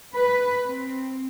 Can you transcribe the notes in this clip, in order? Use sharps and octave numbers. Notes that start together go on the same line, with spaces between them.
B4
C4